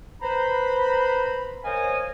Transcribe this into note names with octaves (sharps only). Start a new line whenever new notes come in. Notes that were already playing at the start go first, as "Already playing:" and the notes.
B4 C5 A#5 B5
A#4 C5 C#5 D#5 F5 G#5